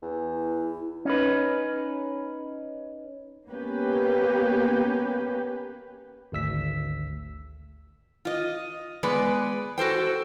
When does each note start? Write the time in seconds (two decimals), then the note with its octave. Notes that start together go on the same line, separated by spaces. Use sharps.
0.02 E2
0.34 E4
1.05 C#4 D#4 B4
3.49 A#3 B3 C#4 G4 B4
6.32 G#1 D2 E6 B6
8.25 F4 D#5
9.03 G#3 B3 B4 D5
9.78 F#4 A4 C5 G5